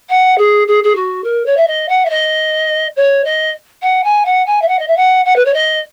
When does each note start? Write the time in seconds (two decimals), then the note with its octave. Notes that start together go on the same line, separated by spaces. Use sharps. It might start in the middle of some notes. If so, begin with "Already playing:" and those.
0.09 F#5
0.38 G#4
0.67 G#4
0.84 G#4
0.95 F#4
1.24 A#4
1.46 C#5
1.57 E5
1.67 D#5
1.89 F#5
2.05 E5
2.10 D#5
2.96 C#5
3.25 D#5
3.82 F#5
4.04 G#5
4.25 F#5
4.46 G#5
4.62 E5
4.68 F#5
4.79 D#5
4.88 E5
4.97 F#5
5.25 F#5
5.36 B4
5.45 C#5
5.54 D#5